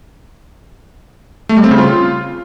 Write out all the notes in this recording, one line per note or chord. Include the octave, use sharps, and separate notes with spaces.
A3
G3
C4
C#3
F4